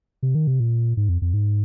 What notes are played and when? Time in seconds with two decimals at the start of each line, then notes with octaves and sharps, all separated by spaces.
0.23 C3
0.35 D#3
0.47 C3
0.60 A#2
0.97 G#2
1.09 F2
1.22 F2
1.34 G#2